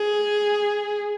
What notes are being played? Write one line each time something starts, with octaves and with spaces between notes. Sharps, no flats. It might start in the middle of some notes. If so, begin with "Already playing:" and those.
Already playing: G#4